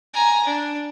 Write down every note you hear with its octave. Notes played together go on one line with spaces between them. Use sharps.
G#5 A#5
D4